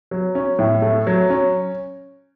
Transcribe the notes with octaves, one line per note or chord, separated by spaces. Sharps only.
F#3
C#4
A2
A3
F#3
C#4